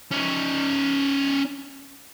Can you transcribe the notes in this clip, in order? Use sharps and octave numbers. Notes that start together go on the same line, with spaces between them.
C#4 D#4